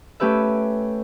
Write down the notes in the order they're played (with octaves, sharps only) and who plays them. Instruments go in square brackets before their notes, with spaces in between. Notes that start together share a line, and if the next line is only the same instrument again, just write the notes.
[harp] A3 C#4 G4 B4 E5